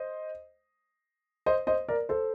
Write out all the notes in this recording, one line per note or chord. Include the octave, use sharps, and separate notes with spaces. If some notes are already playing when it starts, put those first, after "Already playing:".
Already playing: C5 D#5
C5 D#5
C5 D#5
A#4 D5
A4 C5